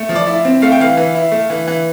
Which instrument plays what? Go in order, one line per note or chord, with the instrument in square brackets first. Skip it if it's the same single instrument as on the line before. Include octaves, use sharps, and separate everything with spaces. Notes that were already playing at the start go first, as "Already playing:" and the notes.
Already playing: [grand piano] A3
F3
D5
E4
C4
A3 F5
G5
E3 F5
E3
E4
A3
E3
E3